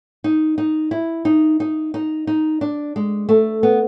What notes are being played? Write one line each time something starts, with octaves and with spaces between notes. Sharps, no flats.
D#4
D#4
E4
D#4
D#4
D#4
D#4
D4
G#3
A3
B3